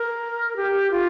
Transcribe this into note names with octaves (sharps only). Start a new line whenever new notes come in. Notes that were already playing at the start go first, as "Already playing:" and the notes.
Already playing: A#4
G4
F4